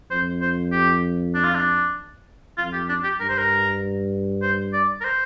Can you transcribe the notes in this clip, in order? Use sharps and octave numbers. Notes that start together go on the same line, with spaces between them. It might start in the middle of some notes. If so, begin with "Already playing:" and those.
F2 C5
C5
G4
D4
F4
D4
F2 F4
G4
D4
G4
G2 A#4
C5
A#4
C5
D5
A#4
C5